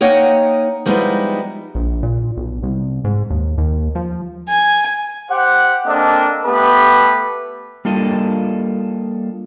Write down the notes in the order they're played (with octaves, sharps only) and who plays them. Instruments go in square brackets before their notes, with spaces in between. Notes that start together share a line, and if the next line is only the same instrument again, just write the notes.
[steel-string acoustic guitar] A#3 D#4 C#5 D#5 F#5 G5
F3 G3 G#3 B3 D#4 E4
[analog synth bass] A#1
A#2
B1
C2
G#2
D#2
D#2
F3
[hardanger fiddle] G#5
[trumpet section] G4 C5 F#5
A#3 C4 D4 A4 D#5
A3 B3 G4 B4
[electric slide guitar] G3 A#3 D4 F4 A4 D#5